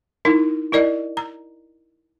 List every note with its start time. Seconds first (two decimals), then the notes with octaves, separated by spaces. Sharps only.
0.25 D#4 E4 A#4
0.72 E4 A#4 D5 D#5
1.17 A#5